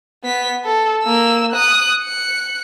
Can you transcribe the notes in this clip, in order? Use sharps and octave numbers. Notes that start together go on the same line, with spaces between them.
B3 B6
A4
A#3 E6
D#6 F#6
F#6 C#7